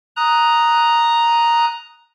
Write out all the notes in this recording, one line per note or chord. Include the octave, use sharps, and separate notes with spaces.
A#5 D#6 F#6